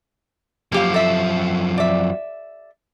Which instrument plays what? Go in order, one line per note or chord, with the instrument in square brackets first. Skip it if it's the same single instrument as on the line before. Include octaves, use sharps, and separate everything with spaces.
[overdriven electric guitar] F#2 F3 [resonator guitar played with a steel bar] A#3 G4 F5
[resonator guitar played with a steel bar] A4 E5
D5 E5